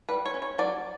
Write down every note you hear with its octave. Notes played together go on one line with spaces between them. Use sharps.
G3 B4
C#5
C#4
C#5
F#3 D5